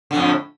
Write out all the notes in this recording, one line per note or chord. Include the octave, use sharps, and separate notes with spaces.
F2 A2 D3